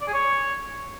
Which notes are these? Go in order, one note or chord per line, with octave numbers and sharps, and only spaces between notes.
D5
G#4
C#5